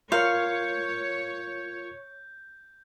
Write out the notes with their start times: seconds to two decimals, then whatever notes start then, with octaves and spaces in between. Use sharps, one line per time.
0.12 F4 A#4 C#5 F5 G6